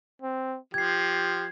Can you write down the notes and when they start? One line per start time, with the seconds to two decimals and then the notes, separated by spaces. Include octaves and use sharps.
0.22 C4
0.74 F3 G4 G#6 C7